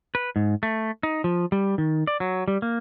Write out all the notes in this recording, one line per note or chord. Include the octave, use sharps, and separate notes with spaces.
B4
G#2
A3
D#4
F3
G3
D#3
D5
F#3
G3
A#3